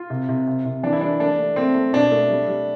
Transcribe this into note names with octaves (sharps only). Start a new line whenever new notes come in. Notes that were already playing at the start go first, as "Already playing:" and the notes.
Already playing: F4
C3
C3
C3
C3
E3 D4
E4
G3 D4
A3 D4
A3
A3 C4
A3
B2 D4
A3
G3
G3